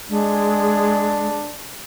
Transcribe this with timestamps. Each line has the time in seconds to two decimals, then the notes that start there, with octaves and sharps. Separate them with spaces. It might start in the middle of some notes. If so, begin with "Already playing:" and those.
0.09 G#3 D4